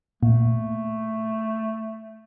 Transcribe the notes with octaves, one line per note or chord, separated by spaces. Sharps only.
A#2 A3